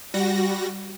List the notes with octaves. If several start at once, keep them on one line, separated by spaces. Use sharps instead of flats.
G3 F#4 A#6